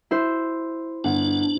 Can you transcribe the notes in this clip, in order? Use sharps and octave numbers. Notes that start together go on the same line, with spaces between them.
E4 C5
G1 D4 F#5